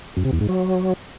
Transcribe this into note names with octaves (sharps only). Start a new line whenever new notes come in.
F#2
C3
E2
G#2
F#3